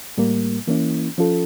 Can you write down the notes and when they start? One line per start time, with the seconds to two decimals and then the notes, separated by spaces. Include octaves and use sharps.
0.17 A2 G3 A#3
0.67 E3 A#3 C#4 E4
1.18 F3 C#4 F4 A4